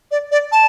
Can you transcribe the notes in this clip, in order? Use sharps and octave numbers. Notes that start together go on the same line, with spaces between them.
D5
D5
A5